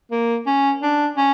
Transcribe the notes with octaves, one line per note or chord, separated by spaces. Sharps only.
A#3
C#4
D4
C#4